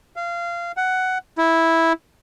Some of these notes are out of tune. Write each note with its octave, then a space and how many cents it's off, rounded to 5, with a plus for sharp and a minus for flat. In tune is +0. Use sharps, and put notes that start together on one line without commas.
F5 -20
F#5 +10
E4 -5